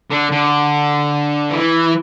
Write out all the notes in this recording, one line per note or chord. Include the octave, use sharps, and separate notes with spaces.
D3
D3
E3